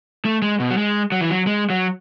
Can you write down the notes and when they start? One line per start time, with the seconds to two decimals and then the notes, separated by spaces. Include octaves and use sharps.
0.25 A3
0.42 G#3
0.60 B2
0.70 F#3
0.77 G#3
1.12 F#3
1.21 E3
1.30 F#3
1.47 G#3
1.70 F#3